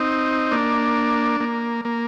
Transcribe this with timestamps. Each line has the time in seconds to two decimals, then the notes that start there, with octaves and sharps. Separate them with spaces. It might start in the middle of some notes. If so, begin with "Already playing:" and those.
Already playing: C4 D#4
0.51 A#3 D4
1.41 A#3
1.85 A#3